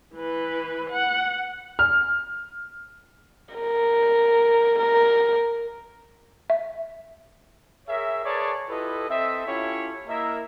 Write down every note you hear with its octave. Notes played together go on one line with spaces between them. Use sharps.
E3 B4
F#5
F6
A#4
A#4
E5
G#4 A#4 C#5 E5
G#4 A#4 B4 C#5 D5 A5
E4 F4 G4 A4 B4 D#5
C4 A4 D#5 E5
C#4 E4 F4 G4 A4 C#5
A#3 E4 A#4 D#5 E5